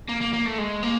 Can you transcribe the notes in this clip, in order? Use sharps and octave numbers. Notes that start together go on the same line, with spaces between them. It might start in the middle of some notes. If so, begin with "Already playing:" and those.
A#3
A#3
A#3
A3
G#3
A#3